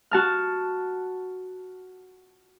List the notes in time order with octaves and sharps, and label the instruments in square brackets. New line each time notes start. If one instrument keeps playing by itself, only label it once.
[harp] F#4 A5 F6